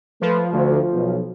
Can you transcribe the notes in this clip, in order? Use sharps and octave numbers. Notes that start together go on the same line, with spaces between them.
F3 A3 B4
D2
B1